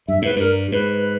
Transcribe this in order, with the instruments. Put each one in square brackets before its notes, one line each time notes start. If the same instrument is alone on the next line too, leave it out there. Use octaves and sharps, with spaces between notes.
[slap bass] G2 [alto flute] E5
[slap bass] G#2 [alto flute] B4
[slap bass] G2 [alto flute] A#4
[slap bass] G#2 [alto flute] B4